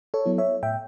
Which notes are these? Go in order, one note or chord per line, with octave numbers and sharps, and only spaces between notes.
A4 C#5
F#3 B3 E4
C#5 E5
A2 E5 G5